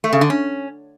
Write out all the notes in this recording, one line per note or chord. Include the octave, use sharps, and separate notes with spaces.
A3
C#3
D3
C#4